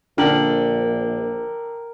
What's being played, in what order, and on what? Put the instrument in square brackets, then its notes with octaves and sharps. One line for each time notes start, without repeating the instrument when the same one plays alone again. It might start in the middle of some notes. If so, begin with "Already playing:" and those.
[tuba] A#1 [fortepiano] D3 [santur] A#4 [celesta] G5 F#7